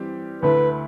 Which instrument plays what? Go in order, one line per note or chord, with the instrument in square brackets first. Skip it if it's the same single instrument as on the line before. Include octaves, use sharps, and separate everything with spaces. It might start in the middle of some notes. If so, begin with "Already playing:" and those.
Already playing: [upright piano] E3 G3 C4 G4
[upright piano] D2 D3 A3 E4 [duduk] B4